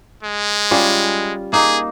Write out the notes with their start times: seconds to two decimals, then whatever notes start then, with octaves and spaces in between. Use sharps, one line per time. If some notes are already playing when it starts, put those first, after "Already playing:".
0.23 G#3
0.71 G3 C#4 F4
1.53 A#3 D#4 G#4